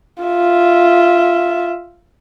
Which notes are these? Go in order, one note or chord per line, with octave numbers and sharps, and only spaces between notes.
F4 E5